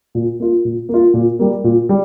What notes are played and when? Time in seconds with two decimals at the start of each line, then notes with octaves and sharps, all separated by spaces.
0.15 A#2
0.40 A#3 F4
0.65 A#2
0.89 A#3
0.94 F4
1.14 A#2
1.39 G3 A#3
1.64 A#2
1.89 G3